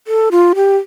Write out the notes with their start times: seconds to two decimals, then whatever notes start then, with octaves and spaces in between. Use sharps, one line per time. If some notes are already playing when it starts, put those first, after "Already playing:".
0.07 A4
0.31 F4
0.55 G4